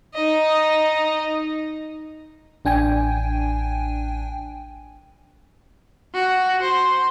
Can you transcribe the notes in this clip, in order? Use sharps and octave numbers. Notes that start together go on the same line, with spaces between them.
D#4 D#5
A1 D4 G5 G#5
F#4
C5